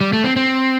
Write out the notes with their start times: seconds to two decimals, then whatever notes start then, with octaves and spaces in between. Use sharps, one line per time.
0.01 G3
0.13 A3
0.24 C4
0.36 C4